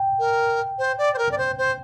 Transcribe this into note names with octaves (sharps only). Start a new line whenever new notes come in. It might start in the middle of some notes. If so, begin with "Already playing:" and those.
Already playing: G5
A#4
C5
D5
C5
A#4
D5
C5
C5